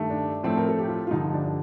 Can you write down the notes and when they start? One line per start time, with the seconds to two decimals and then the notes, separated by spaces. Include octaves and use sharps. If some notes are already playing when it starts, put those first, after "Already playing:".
Already playing: G2 D#3 A3
0.10 D4
0.43 A2 F3 A3 C4
0.57 A#4
0.68 A4
0.79 G4
0.88 F4
1.07 F4
1.11 G2 D3 F3 D#4
1.34 D4
1.45 D4